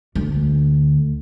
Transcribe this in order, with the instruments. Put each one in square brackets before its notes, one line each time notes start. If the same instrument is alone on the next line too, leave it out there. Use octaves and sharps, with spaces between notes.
[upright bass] D2